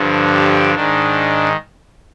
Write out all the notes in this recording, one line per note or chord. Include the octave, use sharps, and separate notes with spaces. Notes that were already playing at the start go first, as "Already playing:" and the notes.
Already playing: G2 D3 F3
G4
G#2 D#3 D4